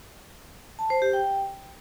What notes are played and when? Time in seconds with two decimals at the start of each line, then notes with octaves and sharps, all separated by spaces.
0.79 A5
0.90 C5
1.02 G4
1.13 G5